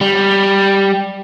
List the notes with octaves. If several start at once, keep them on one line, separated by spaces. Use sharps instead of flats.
G3